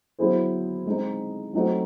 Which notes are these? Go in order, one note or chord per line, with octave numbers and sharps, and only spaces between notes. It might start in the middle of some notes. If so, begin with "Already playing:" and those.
F#3 B3 E4 G#4 C5
G#3 C4 D#4
F#3 A3 C4 D#4 F#4